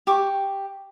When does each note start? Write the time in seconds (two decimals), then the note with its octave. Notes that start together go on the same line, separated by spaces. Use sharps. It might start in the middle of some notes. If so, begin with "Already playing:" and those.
0.07 G4 C#6 D6